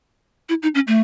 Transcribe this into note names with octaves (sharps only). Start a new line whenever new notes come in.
E4
D#4
C#4
A3